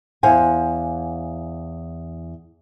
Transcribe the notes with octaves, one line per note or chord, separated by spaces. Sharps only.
E2 C5 F5 F#5 G#5